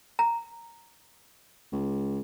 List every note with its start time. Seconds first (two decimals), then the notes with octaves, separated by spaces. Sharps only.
0.19 A#5
1.72 C#2